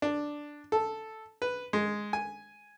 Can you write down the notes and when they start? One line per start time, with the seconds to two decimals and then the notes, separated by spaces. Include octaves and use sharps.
0.02 D4
0.72 A4
1.42 B4
1.73 G#3
2.13 G#5